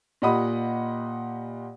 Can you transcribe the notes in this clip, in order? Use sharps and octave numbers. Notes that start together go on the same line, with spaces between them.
A#2 G4 D#5 F#5 B5 D#6